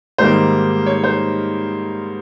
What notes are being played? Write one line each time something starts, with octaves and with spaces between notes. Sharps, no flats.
G#2 D#3 G3 A#3 C5
C#5
C5